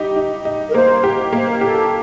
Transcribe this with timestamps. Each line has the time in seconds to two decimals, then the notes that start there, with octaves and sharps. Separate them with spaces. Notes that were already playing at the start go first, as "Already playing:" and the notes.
Already playing: G3 D#4 G4
0.16 D#4
0.45 D#4
0.70 A#4
0.74 A#3 C5
1.04 G4
1.32 A#3 C5
1.48 A#4
1.61 G4 A4